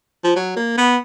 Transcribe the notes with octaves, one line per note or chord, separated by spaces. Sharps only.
F3
F#3
A#3
B3